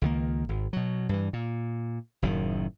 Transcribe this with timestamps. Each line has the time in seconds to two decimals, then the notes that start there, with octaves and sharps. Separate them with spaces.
0.02 C#2 D#3 A#3
0.49 G#1
0.73 B2 F#3
1.09 G2 E3
1.33 A#2
2.22 F#1 F#2 A2 D#3